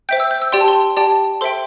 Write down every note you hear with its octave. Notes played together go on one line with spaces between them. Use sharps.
C5 E5 G5 G6
E6
G6
E6
G4 D5 G5 C6
A5
C6
G4 D5 G5 A5
A4 C5 E5 G5 C6